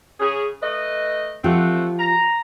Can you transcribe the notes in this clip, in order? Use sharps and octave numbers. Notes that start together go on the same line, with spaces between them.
C#3 C#4 G#4
A3 B4 D#5
F3 A3 C4 F4 G4 F#5
A#5